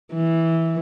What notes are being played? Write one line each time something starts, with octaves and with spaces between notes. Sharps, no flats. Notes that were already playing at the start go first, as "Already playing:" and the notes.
E3